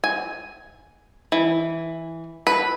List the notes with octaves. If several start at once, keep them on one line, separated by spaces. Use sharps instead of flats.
G#5
E3
B4